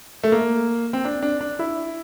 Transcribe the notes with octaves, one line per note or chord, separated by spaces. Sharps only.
A3
A#3
C4
D4
D4
D4
E4